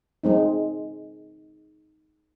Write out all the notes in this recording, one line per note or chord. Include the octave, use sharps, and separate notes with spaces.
G#3 C4 D#4